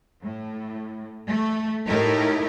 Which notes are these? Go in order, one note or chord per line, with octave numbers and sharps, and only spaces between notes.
A2
A3
A2 A3 D#4 E4 G4 A#4